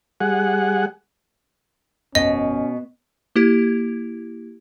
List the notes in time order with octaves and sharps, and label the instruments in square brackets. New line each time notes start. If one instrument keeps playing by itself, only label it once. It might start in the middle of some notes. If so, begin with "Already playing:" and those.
[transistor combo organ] G3 G#4 F#5
[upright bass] G1 F2 [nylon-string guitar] B2 [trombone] C#4 [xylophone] D#5
[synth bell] A#3 E4 G4